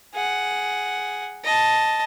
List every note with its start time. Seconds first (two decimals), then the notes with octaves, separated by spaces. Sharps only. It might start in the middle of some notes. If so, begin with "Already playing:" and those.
0.14 G#4 F#5
1.44 D#5 A5